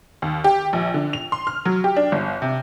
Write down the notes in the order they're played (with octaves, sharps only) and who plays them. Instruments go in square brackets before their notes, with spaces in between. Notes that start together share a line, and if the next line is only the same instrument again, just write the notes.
[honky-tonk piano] D#2
G4
A#1
D3
F7
C6
F6
F#3
G4
D4
G1
C3